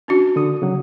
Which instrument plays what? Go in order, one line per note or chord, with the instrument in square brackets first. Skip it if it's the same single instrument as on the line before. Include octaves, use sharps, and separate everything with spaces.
[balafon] C#4 D4 F#4
[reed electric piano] D3 D#6
C#3 F#3